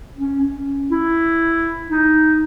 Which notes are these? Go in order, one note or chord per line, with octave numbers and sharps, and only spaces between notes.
C#4
C#4
E4
D#4